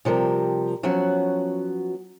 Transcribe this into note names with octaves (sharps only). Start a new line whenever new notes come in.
C3 F3 G3 A#4
F3 F#3 B3 C#4 F#4